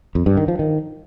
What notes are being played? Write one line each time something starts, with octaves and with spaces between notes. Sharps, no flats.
F2
G2
D#3
F3
D#3